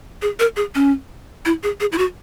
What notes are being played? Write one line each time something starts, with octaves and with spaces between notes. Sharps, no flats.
G#4
A#4
G#4
C#4
E4
G#4
G#4
E4
F#4